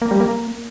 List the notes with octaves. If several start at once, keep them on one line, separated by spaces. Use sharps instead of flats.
A#3
G3
A#3